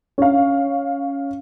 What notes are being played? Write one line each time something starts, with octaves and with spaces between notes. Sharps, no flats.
C#4 F5